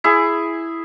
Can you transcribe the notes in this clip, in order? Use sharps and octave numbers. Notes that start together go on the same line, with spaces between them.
E4 G#4